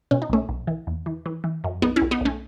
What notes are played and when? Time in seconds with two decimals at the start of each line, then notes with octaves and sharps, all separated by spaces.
0.11 B2 C#4
0.22 D#4
0.30 B1 A3 C#4
0.49 B1
0.67 E3
0.87 E2
1.06 E3
1.26 E3
1.44 E3
1.64 F#2
1.82 B1 B3 D#4
1.96 C#4 E4
2.02 B1
2.11 B3 D#4
2.21 B1 A3 C#4